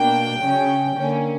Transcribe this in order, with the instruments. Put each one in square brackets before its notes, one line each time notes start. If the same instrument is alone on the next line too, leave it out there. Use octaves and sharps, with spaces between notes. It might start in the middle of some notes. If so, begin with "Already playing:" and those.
Already playing: [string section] B2 A#3 D4 G5
C#3 F#3 C#4
D3 A#3 C#4